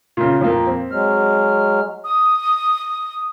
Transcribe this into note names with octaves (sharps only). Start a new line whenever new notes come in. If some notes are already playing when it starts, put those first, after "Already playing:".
A#2 C#3
F2 A#2 A#3
C4
F#3 G#3 F6
D#6